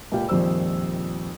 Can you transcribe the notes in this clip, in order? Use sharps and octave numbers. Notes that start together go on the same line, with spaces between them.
C#2 A#2 G4 F5 G5
A#1 F2 D#3 G3 C5 E6